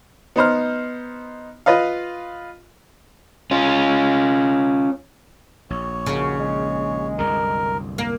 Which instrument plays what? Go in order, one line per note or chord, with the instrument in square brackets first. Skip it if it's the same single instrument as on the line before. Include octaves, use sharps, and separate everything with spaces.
[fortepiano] B3 D#4 C5 F6
F4 B4 D#5 F5
[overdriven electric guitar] C#4 F4
[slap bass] A#1 [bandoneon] C#5
[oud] D#2 C#3 [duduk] F#4
[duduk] G#3
[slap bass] C2 F#2 D3 [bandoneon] A#4
[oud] A#3